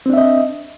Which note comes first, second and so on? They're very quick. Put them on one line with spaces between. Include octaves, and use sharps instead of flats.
C4 D4 E5 D#5